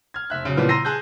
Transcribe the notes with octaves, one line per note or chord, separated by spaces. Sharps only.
F6 G#6
F1 E5 F#6
C#3 F#3
A#2 C#3 E3 F3 G3 B3
A#5 C6 E6 A#6 C7 D#7
G#4 A5 F#6 G6